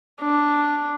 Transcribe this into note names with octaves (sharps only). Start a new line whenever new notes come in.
D4